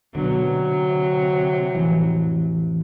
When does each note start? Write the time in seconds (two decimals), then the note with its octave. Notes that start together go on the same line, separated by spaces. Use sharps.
0.15 B2 D3 F#3
0.50 C3
1.75 A1 F2 E3